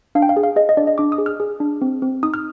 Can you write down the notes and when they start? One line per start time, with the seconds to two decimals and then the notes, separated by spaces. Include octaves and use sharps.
0.15 D4 F5
0.22 G5
0.29 F5
0.37 G#4
0.43 F5
0.56 G#4 D#5
0.69 D#5
0.77 D4 D5
0.87 D#5
0.98 D4 D6
1.12 D#6
1.18 G#4
1.26 F6
1.40 G#4
1.60 D4
1.82 C4
2.02 C4
2.23 D#4 D#6
2.34 F6